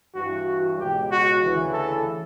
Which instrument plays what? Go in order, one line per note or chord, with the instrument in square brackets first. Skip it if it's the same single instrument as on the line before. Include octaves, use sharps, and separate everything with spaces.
[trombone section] G2 E3 F#4
C#2 B2 G4
F#4
D2 C#3 E3
A4